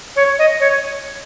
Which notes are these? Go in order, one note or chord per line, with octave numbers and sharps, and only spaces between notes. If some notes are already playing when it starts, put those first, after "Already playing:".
C#5
D#5
C#5